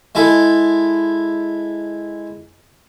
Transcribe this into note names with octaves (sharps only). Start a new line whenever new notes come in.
G#3 E4 A4